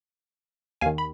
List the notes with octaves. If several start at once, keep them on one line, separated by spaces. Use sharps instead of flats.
D#2 D#3 F5 G#5
B5